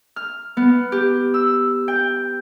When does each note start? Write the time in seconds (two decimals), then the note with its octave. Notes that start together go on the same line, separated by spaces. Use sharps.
0.16 F6
0.57 B3
0.92 G4
1.34 E6
1.88 G5